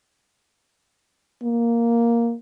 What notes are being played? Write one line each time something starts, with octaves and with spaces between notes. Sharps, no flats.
A#3